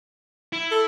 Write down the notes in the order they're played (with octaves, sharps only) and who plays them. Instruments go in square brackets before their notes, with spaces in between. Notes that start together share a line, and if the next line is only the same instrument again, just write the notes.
[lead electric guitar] E4
[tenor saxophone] A4